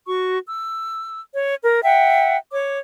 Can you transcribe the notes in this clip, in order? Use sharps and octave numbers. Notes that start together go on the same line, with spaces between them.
F#4 C#6
E6
C#5
A#4
E5 F#5 G5
C#5 D6